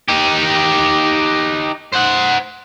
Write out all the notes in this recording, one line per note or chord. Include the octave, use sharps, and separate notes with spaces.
D#4 G4
C5 F#5